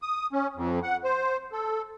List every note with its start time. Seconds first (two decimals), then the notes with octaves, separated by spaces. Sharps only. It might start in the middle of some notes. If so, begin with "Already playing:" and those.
0.02 D#6
0.33 C#4
0.56 F2
0.83 F#5
1.04 C5
1.52 A4